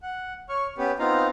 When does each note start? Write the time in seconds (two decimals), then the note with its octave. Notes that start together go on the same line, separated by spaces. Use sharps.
0.03 F#5
0.49 C#5 C#6 F6
0.78 B3 C#4 G4 B4
0.99 B3 C4 D#4 F4 F5 A#5